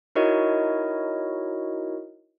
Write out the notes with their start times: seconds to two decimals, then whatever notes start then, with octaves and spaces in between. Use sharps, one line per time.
0.15 D#4 E4 F#4 A#4 C#5 D#5